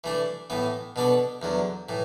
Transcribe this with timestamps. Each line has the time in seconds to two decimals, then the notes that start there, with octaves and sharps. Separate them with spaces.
0.04 E3 A3 D4
0.50 A2 E3 B3
0.96 B2 B3 D4 A4
1.42 E2 D3 F#3
1.89 A2 E3